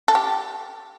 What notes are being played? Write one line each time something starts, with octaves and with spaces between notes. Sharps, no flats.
A4
G4